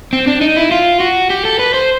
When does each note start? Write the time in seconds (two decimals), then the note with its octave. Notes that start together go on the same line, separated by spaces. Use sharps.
0.13 C4
0.27 D4
0.41 D#4
0.56 E4
0.71 F4
1.00 F#4
1.30 G4
1.45 A4
1.59 B4
1.74 C5